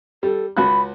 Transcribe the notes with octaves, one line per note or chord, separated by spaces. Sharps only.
G3 A4
C#2 F#4 B5 F#6